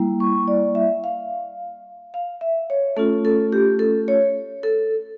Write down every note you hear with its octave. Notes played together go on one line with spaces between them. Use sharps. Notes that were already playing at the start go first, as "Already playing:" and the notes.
Already playing: G3 A#3 E4
C#6
D5
E5
F5
F5
E5
C#5
A3 C#4 F4 A4
A4
G4
A4
C#5
A4